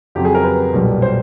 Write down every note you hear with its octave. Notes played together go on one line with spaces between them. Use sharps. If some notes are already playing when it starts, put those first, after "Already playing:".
F2 C#3 F#3 G4
G#4
A#4
B4
B1 A#2 G3
C5